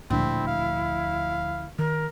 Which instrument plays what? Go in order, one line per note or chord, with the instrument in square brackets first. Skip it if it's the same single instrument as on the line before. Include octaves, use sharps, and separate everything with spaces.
[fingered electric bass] E1 A#2 D4 [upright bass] D2 F3 [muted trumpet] C4 [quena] E4
[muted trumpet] F5
[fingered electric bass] D#3 [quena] A#4